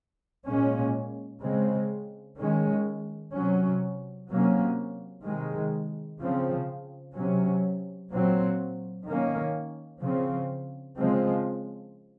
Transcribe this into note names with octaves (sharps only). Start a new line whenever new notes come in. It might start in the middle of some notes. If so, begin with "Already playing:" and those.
A#2 G#3 C#4
C#3 G#3 C4
D#3 G#3 C#4
C3 F#3 C#4
C3 F#3 A#3 C#4
C3 D#3 G#3
C#3 F3 C4
C3 F#3 C#4
A#2 F#3 C4
D#3 A#3 C#4
C#3 F3 C4
C#3 F3 G#3 C4